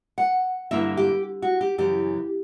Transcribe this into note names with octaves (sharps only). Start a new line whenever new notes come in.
F#5
G2 D3 A#3 E4 E5
G4
F#4
G4
F#2 C#3 E3 G4